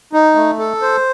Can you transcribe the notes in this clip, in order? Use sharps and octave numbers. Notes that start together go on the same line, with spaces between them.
D#4
A3
A4
C5